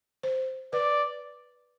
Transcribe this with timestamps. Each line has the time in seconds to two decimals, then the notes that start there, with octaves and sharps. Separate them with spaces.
0.23 C5
0.73 B4 D5